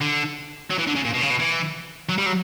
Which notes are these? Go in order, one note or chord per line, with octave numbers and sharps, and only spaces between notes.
D3
F#3
E3
D3
C#3
A#2
B2
C#3
B2
E3
F#3
G3
F#3